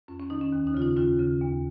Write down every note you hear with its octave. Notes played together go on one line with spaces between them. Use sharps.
F2 C#4
C#4
D#3 D#4
C#4
D#2
D#4
C#3 F4
D#4
D#2 C#4 F4
C#3
D#2